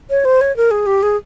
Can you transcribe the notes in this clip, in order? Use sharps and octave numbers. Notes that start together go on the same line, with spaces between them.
C#5
C5
C#5
A#4
G#4
G4
G#4